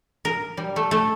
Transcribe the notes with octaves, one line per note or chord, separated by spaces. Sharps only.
A#4
G3
A3
A3